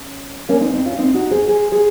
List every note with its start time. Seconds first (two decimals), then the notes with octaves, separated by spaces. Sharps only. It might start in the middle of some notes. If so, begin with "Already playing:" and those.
Already playing: C#4
0.49 A#3 C#4
0.60 C4 D#4
0.73 C4 D#4
0.86 C#4 F4
0.98 C4 D#4
1.14 D#4 F#4
1.31 G#4 C5
1.47 G#4 C5
1.72 G#4 C5